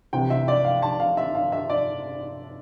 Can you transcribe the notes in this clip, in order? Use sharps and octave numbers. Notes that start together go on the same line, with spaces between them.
C2 C3 E3 G5
E5
D5
F5
A5
F5
E5
F5
E5
D5